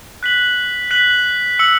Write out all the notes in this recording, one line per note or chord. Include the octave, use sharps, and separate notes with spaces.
F#6 B6 F#7
F#6 B6 F#7
E6 C#7 F#7